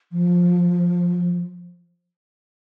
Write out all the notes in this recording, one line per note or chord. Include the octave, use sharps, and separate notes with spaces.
F3